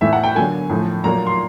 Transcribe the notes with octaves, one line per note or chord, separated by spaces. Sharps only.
A2 E3 A3 E5
F#5
G5
D3 F#3 A#3 G#5
A2 F3 A3
A#2 F#3 A#3 A#5
C6